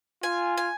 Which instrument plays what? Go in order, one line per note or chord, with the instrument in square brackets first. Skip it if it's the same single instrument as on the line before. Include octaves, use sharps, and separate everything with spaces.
[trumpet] F4 [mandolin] G#5
[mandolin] G#5